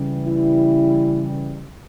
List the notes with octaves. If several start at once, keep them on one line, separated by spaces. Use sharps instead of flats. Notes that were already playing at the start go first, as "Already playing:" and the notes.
Already playing: C#3 E3 G3
E4